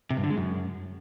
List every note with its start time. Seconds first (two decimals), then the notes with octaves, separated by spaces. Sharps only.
0.10 C3
0.17 G2
0.24 D3
0.30 G#3
0.37 F#2